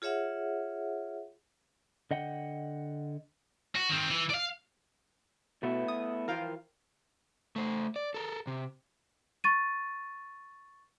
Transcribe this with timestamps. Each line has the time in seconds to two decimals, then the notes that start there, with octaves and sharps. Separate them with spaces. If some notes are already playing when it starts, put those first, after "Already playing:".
0.02 F4 G#4 C#5 E5 F#5
2.11 D3 D#5 F#5 G5
3.75 F#4
3.90 D#3 C4
4.10 E3
4.30 D5 F5
5.63 B2 A3 B3 E4
5.88 D#6
6.28 E3 F3 F4 A#4 F5 G5
7.56 A3 C5
7.96 D5
8.14 A4 A#4
8.47 C3
9.44 C#6 A6 D#7